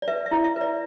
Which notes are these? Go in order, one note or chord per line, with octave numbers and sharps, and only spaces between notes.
D5
B4 E5
E5
E4
E5
B4 D5